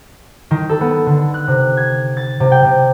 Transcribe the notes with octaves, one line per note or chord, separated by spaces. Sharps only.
D#3
A4
B3
D3
F#6
C3
G#6
A6
C3
G5
C3